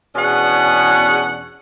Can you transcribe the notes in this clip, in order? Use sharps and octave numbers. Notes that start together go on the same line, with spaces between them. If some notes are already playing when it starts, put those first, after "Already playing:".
E2 B2 C#4 D4 G#4 F#5